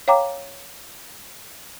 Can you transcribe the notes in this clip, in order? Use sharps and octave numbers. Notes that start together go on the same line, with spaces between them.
C#5 F5 G5 A#5 D6